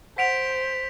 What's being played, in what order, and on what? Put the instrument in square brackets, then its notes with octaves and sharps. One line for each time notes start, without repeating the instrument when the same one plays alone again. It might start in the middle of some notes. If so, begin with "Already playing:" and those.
[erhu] C5 [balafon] F#5 [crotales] B6 D7 F7